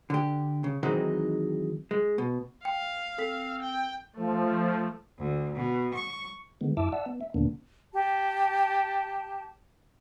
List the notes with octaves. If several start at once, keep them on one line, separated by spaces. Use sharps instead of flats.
D3 G4
C#3
D#3 E3 F#3 G#3 C4 D#4
G#3
B2
F5 G5
C4 A4 B6
G5
F3 A3
D2
B2
C#6
D3 D#3 G#3 B3
F#2 E4 E5 A5 D6 E6
D5 E5 F#5 A5 E6
B3
E5
D#2 A#2 D3 A#3 B3 D4
G4 A5